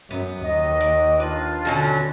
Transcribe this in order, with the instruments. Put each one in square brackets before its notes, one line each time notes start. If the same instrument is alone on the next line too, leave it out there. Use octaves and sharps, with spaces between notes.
[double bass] F#2 [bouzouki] B3
[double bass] D#2 [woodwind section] D#5
[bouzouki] D5
[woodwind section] D4 F4 [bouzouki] B4
[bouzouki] B2 F#3 C#4 [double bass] D3